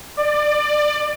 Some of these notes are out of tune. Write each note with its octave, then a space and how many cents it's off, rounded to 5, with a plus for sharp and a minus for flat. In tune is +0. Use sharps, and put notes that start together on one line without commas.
D5 +25